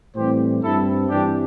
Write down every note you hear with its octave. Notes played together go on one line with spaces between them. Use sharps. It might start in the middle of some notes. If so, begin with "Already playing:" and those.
A2 E3 G3 C4 G4 C5
G2 G3 C4 E4 A4
G2 E3 G3 C4 D4 G4